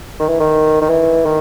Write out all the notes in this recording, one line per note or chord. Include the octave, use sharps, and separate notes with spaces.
D#3
E3
D#3
D#3
E3
D#3